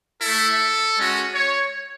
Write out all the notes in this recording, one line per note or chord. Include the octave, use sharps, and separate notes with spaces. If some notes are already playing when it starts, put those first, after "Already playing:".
E4 A4
A3
G#3 C#4 F#4
C#5